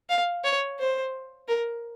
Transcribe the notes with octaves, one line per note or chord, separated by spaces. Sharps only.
F5
C#5
C5
A#4